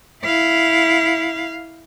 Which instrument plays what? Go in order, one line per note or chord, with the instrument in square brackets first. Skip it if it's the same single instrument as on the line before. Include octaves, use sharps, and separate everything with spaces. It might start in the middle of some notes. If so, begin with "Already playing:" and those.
[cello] E4 F5